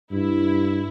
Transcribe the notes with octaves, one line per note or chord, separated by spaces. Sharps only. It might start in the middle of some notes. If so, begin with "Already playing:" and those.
G2 E4